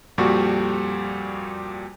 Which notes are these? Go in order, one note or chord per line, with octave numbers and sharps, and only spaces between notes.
F2 A#2 G3 F#4 C#6